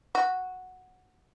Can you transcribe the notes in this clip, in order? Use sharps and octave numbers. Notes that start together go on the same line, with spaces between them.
F#4